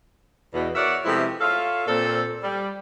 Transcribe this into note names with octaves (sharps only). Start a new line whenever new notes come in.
E2 B2
F#4 A#4 C#5 D5 E5 F#5
C3 F3 G#3 A3 B3 E4
F4 A4 C#5 E5 F5
A#2 C4 A4
G3